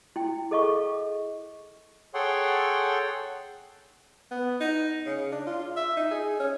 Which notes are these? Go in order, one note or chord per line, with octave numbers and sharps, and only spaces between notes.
E4 G5
G#4 A4 D#5 F5 C#6
G#4 A4 C#5 F#5 G5 C6
B3
D#4
C#3
D4
F4
E5
D#4
G#4
C#4